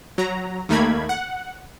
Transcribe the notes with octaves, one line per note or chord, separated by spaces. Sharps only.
F#3 A#5
D#2 D#3 A3 A#3 B5 G#6
F#5